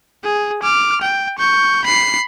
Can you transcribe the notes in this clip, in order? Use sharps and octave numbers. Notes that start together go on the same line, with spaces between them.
G#4
D6 F6
G5
C#6 G6
B5 C7